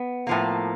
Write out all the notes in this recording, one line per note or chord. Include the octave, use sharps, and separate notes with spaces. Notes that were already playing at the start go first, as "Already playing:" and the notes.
Already playing: B3
A2 F3 A#3